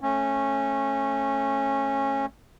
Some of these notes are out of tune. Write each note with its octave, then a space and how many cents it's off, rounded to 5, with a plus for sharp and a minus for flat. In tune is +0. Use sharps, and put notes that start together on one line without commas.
A3 +0 C#4 -20